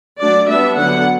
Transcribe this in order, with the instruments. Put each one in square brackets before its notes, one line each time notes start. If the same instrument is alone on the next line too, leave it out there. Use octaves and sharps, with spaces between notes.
[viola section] F#3 A3 D4 D5
G3 B3 D4 E5
D3 F#3 B3 D4 F#5